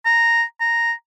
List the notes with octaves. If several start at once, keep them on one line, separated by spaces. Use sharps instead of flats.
A#5
A#5